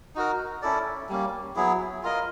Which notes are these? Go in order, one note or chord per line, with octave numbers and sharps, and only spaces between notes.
D#4 F#4 A#4
C#4 E4 A4 D5
G3 A#3 C#4
F#3 B3 E4 G#4
F4 A#4 D#5